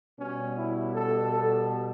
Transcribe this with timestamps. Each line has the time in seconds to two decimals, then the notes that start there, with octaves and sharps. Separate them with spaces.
0.19 B2 G3 C#4
0.57 E4
0.94 A4
1.31 A4